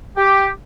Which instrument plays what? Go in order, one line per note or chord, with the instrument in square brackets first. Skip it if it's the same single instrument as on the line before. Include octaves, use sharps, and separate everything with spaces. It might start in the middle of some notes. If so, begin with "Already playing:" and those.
[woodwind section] G4